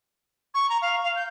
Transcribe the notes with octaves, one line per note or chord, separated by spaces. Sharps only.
C#6
A#5
F5
F5
G6